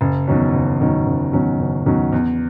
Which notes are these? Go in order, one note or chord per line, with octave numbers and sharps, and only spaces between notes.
F#1
E2 D#3 F#3 C#4
F#1
E2 D#3 F#3 C#4
F#1
E2 D#3 F#3 C#4
F#1
E2 D#3 F#3 C#4
E2